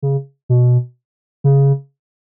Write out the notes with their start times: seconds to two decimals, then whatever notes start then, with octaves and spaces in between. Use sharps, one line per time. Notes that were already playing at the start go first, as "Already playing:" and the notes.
0.02 C#3
0.49 B2
1.44 C#3